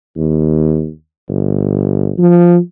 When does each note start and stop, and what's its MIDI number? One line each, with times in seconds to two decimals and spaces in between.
0.17 0.90 39
1.28 2.12 31
2.18 2.57 53